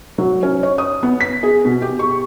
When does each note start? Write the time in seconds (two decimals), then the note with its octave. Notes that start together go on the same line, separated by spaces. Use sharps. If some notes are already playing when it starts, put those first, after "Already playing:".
0.18 F#3
0.43 C#4
0.63 C#5
0.78 D#6
1.03 B3
1.21 B6
1.43 G#4
1.65 B2
1.82 G4
1.99 C#6